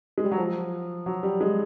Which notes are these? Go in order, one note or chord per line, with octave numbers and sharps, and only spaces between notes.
G#3
G3
F#3
F3
F#3
G3
G#3